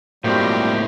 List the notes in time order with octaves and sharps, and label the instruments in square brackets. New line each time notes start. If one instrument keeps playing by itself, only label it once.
[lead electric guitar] A2 G#3 [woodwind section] F3 F#4 G4 [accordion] G3 [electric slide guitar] A#3 C4